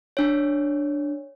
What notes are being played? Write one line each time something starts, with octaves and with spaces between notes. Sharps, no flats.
D4 C#5